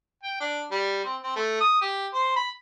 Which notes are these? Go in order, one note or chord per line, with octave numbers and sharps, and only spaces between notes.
G5
D4
G3
C4
C4
A3
D#6
G4
C5
B5